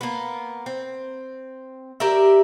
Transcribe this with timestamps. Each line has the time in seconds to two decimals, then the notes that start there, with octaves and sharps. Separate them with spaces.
0.01 A#3 B3
0.66 C4
2.00 G4 A#4 D5 E5